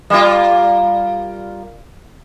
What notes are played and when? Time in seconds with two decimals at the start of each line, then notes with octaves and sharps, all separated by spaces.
0.10 G3 A#3 F4